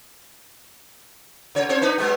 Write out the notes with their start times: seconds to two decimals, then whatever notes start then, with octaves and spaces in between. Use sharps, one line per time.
1.55 C#3 C#5
1.69 C4 C5 C#5
1.82 D4 D#4 B4
1.98 F#3 G#3 B3